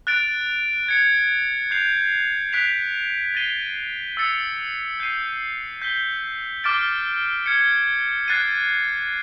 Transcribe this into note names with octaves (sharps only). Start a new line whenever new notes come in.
F#6 A6 D7 F7
G#6 C#7 F7
G6 C7 F7
F#6 B6 D7 F7
A6 C7 D#7 G7
E6 A6 C#7 F7
G6 C7 D#7
G6 B6 D#7 G7
D6 F6 A6 D7 G7
F6 G#6 C#7
F#6 A6 C7 D#7